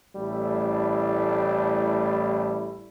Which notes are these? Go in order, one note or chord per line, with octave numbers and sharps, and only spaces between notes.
A1 G3 A3 E4